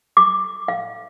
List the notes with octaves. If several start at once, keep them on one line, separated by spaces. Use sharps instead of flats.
D6
F5